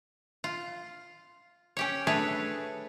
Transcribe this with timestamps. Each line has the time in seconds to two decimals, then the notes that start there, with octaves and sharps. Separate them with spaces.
0.44 F4
1.77 C#4 G4 C#5
2.07 A3 D4 G#4 B4 C#5